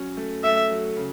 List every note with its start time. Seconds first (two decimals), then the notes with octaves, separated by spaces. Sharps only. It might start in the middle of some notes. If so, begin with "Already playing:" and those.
Already playing: F#3 C#4
0.17 A3
0.44 A3 E5
0.71 F#3
0.97 C#3